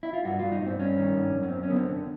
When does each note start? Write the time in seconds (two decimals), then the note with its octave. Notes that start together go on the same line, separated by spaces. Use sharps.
0.03 E4
0.14 F4
0.25 G2 F#4
0.39 G2 F4
0.52 D#4
0.62 G2 C4
0.79 G2 C#4
0.98 D#3
1.17 G2
1.35 F#2
1.43 C#4
1.49 F#2 C4
1.63 C#4
1.70 D3 B3
1.76 C4
1.91 D3